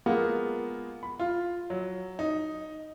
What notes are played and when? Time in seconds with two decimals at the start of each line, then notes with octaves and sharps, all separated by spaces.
0.06 G#3 A#3 B3 F4
1.03 B5
1.19 F4
1.70 F#3
2.19 D#4